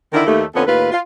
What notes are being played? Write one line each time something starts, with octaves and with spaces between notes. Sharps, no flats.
D3 D#3 E4 A#4 D5
D#2 A3
F2 D3 B3 C#4 A4
D#2 A2 F4 B4
F4